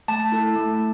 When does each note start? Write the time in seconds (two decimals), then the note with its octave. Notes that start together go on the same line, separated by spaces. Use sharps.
0.08 A3 A5
0.32 E4 A4
0.56 A3